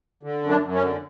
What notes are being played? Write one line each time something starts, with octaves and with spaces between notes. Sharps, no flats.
D3
F#2
D4
F#2
C#4
D3